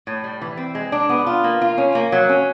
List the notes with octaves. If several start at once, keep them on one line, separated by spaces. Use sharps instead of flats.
A2
G3
E3
C4
G#3
D4
B3
F4
A#3
F4
C#4
A#3
F#3
C#4